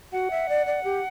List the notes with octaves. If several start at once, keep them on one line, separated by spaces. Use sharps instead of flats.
F#4 F#5
E5
D5
D5
G4